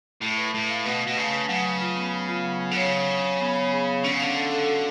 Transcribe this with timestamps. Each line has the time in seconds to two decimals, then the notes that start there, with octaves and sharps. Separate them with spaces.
0.21 A2 A3
0.37 B4
0.54 A2 A3
0.69 F5
0.85 B2 B4
1.01 B4
1.07 B2
1.17 C#3 A3
1.33 B4
1.49 C#3 F#3
1.65 F#3
1.81 F4
1.97 B3
2.13 F4
2.29 F4
2.44 F#3
2.60 F#3
2.71 D3
2.76 C#3 C#5
2.92 C#5
3.08 C#5
3.24 C#5
3.40 B3
3.56 C#5
3.72 G#4
3.88 C#5
4.04 D3 C#4
4.13 C#3
4.20 D3 F5
4.36 A4
4.51 A4
4.67 F#4